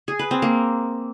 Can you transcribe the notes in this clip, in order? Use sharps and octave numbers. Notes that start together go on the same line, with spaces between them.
G#4
B4
C4
A#3